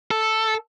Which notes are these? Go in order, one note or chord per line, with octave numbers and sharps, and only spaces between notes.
A4